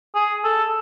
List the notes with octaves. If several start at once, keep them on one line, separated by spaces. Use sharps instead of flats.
G#4
A4